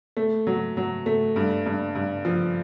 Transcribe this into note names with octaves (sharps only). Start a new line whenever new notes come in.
A3
F#3
F#3
A3
G2
G2
G2
F3